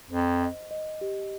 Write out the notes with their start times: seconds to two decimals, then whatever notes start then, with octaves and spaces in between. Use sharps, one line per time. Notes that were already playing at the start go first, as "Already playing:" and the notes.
0.10 F2 C5
0.41 D#5
0.71 D#5
1.01 G4